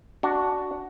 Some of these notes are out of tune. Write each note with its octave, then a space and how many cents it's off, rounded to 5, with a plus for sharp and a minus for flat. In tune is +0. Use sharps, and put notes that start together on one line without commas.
D4 +0 F#4 +10